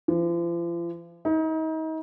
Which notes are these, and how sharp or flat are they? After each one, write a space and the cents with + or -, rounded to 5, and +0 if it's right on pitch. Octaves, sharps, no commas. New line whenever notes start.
F3 -40
D#4 +35